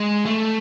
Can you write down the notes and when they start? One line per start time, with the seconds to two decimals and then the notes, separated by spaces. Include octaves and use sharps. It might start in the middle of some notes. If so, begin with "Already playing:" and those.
Already playing: G#3
0.25 A3